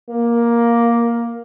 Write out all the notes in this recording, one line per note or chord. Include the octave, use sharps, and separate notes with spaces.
A#3